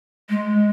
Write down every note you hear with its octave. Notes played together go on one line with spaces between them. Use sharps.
G#3